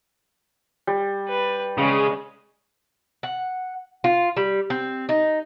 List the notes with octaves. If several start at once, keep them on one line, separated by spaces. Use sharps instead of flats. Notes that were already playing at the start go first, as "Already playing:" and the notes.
G3
B4
C#3 G#3 C#4
F#5
F4
G3
C4
D#4